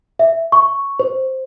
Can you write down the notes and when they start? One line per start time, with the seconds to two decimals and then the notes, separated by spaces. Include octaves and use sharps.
0.19 E5
0.52 C#6
1.00 C5